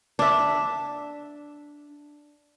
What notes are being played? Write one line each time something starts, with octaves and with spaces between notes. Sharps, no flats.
D4 E5